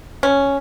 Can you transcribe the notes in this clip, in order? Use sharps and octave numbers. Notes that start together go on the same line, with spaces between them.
C#4